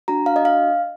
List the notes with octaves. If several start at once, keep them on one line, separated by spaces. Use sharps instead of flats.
D4 F#4 A#5
F5
D#5
F5